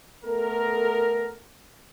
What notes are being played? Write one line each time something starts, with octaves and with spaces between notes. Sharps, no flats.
A3 B3 A4 A#4